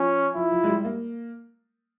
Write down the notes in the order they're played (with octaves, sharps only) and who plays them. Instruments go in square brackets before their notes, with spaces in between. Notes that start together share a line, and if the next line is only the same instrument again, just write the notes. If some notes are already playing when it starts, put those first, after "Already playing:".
Already playing: [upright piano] F3 [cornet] C#4
[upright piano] F3 [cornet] E4
[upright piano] F3
G#3
G3
A#3